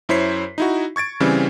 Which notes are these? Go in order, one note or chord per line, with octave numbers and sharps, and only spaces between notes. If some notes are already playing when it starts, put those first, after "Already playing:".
F#2 E4 C5 C#5 B6 C7
D#4 E4 F#4
C#6 G#6 A6 D7
C#3 E3 G3 C4 C#4